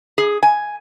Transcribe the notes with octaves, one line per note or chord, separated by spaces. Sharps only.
G#4
G#5